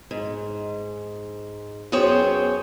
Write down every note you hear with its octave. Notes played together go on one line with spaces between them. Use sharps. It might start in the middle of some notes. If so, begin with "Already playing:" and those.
G#2
F#2 B3 G#4 C5 C#5 G5